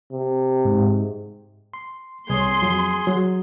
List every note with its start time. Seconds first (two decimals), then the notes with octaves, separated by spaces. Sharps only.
0.13 C3
0.65 G#2
1.74 C6
2.30 C2 G#4 C#5 C6
2.62 F2 F#3
3.07 F#3